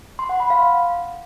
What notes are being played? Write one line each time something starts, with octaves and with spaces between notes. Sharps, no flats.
C6
F#5
B5
F5